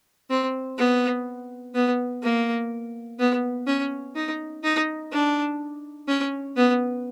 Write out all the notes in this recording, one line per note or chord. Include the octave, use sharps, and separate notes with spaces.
C4
B3
B3
A#3
B3
C#4
D#4
D#4
D4
C#4
B3